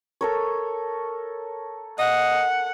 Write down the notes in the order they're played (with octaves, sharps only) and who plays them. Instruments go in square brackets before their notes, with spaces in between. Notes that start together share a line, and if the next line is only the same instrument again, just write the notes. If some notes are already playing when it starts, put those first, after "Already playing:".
[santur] A4 A#4 C#5
[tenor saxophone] D#5 [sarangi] F#5